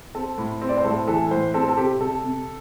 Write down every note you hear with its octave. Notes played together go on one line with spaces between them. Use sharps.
C4 A4
A2
C4
D5
C5
A2 A4
E3 A4
A2 C5
C4 A4
A4
C3 G4
C3 A4
C3